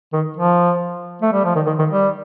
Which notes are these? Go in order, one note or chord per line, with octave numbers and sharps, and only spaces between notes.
D#3
F3
A3
G3
F3
D#3
D#3
D#3
G3